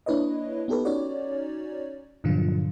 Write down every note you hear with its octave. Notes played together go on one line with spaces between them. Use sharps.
A#3 D4 E4 B4 C#5 D#5
B3 D#4 G4 A4 B4
C#4 D#4 F#4 C#5 D5
G2 A#2 D3 F3 F#3 F4